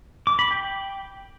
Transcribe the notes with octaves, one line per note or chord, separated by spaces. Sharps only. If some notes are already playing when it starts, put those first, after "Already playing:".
D6
B5
G5